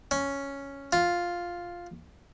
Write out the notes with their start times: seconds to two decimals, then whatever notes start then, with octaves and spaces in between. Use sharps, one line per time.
0.11 C#4
0.93 F4